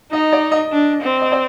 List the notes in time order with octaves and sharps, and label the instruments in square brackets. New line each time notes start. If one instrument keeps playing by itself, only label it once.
[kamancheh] D#4 [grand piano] D#5
[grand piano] D5
D#5
[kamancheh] D4
C4
[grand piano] D#5
D5